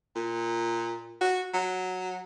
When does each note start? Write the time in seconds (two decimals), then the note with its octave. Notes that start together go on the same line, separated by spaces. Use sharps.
0.16 A#2
1.21 F#4
1.54 F#3